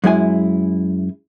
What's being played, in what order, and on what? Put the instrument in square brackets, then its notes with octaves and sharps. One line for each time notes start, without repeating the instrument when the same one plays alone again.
[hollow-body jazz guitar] F#2 G#3 E4 G#5